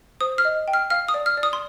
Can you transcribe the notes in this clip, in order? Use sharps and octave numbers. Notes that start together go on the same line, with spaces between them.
C5 D#6
F6
D#5
G5
F6
F5 F6
D#6
D5
F6
D5
D#6
C6